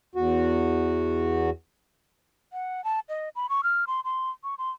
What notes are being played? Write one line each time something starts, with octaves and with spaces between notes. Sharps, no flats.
E2 F#4
F#5
A5
D#5
B5
C#6
F6
C6
C6
C#6
C6